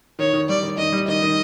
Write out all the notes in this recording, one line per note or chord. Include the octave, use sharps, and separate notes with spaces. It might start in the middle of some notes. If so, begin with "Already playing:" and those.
D#3 C#5
D#3
G3 D5
D#3
D#3 D#5
G3
D#3 D#5
D#3